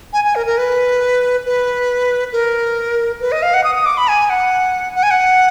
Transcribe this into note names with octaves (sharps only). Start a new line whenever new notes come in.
G#5
G#5
A#4
A#4
B4
B4
A#4
B4
D#5
F5
F#5
D#6
D#6
D6
B5
G#5
F#5
F#5
G#5
F#5